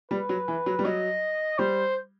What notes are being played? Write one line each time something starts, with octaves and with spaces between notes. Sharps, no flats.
G3 B4
F#3
E3
F#3
G3
F#3 D#5
G3 C5